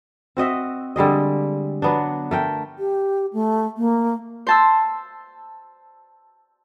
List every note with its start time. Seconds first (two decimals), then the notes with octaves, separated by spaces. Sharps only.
0.37 C4 F#4 D#5 E5
0.96 D3 G3 G#3 D#5
1.82 F#3 B3 D4
2.31 A3 A#4 G5
2.79 G4
3.33 A3
3.77 A#3
4.47 C5 A5 E6